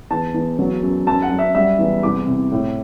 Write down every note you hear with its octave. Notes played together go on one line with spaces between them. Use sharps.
E2 A5
E2
F#3
F#2
F#2 A5
F#5
F#2
E5
G3 E5
E2
C2 D6
C3
A2